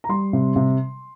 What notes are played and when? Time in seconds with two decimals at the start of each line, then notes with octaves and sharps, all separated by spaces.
0.04 A#5
0.09 G3 C6
0.33 C3
0.56 C3